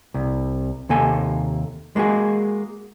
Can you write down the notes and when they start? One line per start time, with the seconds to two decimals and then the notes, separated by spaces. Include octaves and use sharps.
0.14 C2
0.89 D#2 C3 A#3 A4 G#5
1.96 G#3 A#3 F#4 G#4